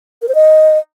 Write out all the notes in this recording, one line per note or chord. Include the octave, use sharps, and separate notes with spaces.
A#4
C5
D#5